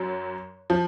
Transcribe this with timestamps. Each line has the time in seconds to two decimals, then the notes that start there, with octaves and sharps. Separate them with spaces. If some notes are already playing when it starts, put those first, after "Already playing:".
Already playing: F#2 F#3
0.70 F3